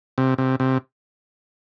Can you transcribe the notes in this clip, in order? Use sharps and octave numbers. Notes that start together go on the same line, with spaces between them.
C3
C3
C3